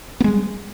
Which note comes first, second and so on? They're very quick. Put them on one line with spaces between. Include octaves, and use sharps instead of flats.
B3 G#3 G3